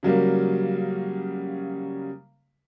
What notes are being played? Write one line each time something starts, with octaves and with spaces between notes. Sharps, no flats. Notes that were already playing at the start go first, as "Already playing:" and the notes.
C#3 F#3 G3 A#3